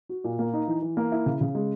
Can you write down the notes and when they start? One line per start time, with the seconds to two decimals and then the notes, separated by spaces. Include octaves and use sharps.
0.09 F#4
0.24 A#2
0.39 A#3
0.53 D#4
0.67 E3
0.82 E3
0.97 A#3
1.12 E4
1.26 C#3
1.41 C#3
1.55 G#3